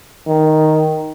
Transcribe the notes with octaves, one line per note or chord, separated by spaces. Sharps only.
D#3